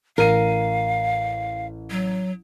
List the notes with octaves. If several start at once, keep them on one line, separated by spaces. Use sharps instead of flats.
A1 A#4 F5 D#7
F#3